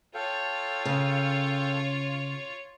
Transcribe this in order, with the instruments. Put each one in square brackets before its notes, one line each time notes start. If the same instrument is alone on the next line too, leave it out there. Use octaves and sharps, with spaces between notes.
[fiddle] F4 C#5 [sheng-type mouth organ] A4 F5 G5
[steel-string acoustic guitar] C#3